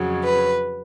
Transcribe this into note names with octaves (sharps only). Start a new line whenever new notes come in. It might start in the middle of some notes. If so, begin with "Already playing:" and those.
Already playing: F2 C#3 F#3
B4